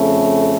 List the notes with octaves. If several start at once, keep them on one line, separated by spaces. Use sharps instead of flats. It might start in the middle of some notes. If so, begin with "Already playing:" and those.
Already playing: F2 C#3 A3